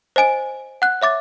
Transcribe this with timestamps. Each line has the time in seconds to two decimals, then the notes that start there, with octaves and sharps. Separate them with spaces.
0.16 C5 D#5 G#5 D7
0.82 F#5 F#6
1.02 C#5 E5 D6 A6